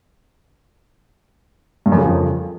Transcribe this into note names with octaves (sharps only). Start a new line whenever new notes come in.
G2
F#2
C#3
F2